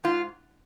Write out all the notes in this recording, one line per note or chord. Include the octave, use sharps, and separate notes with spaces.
G#2 F4